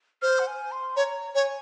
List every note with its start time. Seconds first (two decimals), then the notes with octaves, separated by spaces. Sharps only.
0.22 C5 F6
0.39 F#5
0.47 G#5
0.72 C6
0.96 C#5 A#5
1.35 C#5 G#5